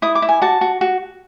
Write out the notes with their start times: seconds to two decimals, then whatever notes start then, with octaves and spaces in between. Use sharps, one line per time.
0.02 E4 D#6
0.15 D6
0.22 E4
0.29 G#5
0.42 F#4 A5
0.61 F#4
0.81 F#4